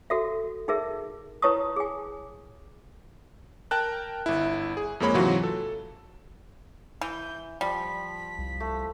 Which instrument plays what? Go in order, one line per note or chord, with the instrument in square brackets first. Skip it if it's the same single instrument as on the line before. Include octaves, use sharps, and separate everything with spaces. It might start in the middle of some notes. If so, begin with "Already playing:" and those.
[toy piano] F#4 A4 E5
D#4 G#4 A#4 E5
E4 B4 C#5 A5 C#6 D#6
G#4 G#5
[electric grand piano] A#4 G5 A5 F#6
G1 E4
G#4
F2 G#3 A#3 C#5 B5
G#2 C3 E3 F#3 F4 F#4
A4
[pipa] E3 [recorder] G6
[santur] F3 [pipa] G3 [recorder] B6
[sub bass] C2
[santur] A3